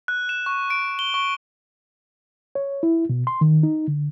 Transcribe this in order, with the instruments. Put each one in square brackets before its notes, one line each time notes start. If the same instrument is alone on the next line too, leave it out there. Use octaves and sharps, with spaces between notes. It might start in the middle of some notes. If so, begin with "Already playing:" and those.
[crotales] F#6
E7
C#6
D7
G7
C#6
[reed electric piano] C#5
E4
B2
C6
D#3
D#4
D3